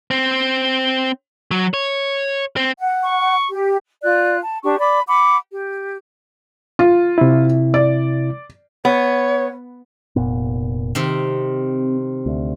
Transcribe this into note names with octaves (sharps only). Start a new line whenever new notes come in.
C4
F#3
C#5
C4
F#5
C#6
G4
F4 D5 F#6
A5
D4 G4 C#6
D5 B5 D6
F#5 B5 D6
G4
F4
C3 E4
D5
B3 C#5
F1 A#2 B3
C3 D#3 C4
D2